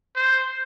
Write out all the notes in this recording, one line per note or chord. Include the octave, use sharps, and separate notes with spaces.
C5